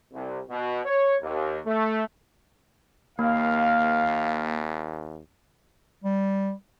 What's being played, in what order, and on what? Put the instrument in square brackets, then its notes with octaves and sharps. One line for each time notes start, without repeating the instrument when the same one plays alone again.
[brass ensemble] C2
B2
C#5
D#2
A3
[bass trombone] D#2 [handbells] A#3 [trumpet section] F5
[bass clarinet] G3